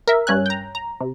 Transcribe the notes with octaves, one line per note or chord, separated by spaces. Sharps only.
A#4 E5
G2 C#4 G#5 F#6
G5 A#5
A#5
C3